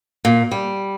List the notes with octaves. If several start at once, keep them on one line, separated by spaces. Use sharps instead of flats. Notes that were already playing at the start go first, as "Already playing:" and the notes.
A#2
G3